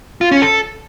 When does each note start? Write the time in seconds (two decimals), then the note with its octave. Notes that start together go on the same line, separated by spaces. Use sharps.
0.21 F4
0.31 C#4
0.42 A4